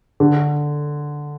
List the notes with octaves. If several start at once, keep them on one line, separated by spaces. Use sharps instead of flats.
D3